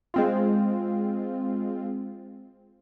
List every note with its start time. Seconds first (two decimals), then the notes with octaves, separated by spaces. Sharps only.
0.14 G#3 C4 F4